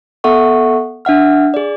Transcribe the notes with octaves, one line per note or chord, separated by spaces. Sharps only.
B3 A4 E5 F#5 C#6
D4 E5 F#5 F6
G#4 D5